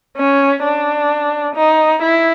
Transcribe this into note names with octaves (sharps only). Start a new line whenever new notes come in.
C#4
D4
D#4
E4